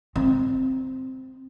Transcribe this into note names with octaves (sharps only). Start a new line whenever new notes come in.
C4